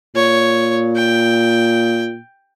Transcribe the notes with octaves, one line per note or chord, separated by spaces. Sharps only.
A#2 C#5
G5